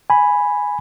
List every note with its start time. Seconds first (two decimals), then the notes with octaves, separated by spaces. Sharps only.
0.10 G#5 B5